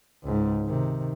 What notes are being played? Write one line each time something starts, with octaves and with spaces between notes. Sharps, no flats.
C#2 G#2
C3 D#3